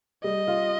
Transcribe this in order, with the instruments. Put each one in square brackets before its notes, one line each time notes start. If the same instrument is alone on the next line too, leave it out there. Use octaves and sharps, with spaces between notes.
[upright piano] G3 [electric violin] D#5
[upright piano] F4